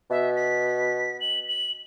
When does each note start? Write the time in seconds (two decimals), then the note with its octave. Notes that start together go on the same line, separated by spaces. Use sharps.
0.11 B2 E5
0.36 B6
1.21 F#7
1.48 F#7